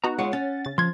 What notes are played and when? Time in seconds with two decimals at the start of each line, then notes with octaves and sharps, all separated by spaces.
0.04 B3 D#4 F#4 A#5
0.19 G#3 F4 C#5 F#5
0.33 C#4 A6
0.65 C#3 A6
0.78 F3 C6 G#6